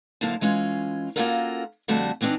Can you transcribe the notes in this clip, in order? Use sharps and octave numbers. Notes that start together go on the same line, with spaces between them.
F#2 D3 A#3 E4 C5 A5
E3 G#3 C#4 F4
A#3 C#4 F4 F#4 A4 A#4
F2 D3 G3 A3 F#4 A5
E3 B3 C4 D4 D#4